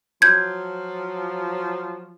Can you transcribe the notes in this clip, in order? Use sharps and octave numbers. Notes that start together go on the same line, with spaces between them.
F3 F#3 G6 G#6